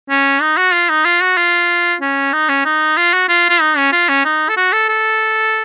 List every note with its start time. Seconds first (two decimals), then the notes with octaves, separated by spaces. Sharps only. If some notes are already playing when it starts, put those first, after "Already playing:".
0.09 C#4
0.41 D#4
0.57 F#4
0.73 F4
0.89 D#4
1.05 F4
1.21 F#4
1.37 F4
2.01 C#4
2.33 D#4
2.49 C#4
2.65 D#4
2.97 F4
3.13 F#4
3.28 F4
3.49 F4
3.61 D#4
3.77 C#4
3.92 F4
4.09 C#4
4.25 D#4
4.48 A4
4.57 F#4
4.72 A4
4.89 A4